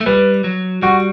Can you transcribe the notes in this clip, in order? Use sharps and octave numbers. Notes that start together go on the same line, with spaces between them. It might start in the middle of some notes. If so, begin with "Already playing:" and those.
A3
G3 B4
F#3
G3 F#4